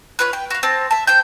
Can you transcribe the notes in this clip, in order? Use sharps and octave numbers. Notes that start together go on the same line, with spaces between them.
C#4 F4 B4 F#6
G5
F#4 F5
C4 A5
E5 A5
C5 G5 G6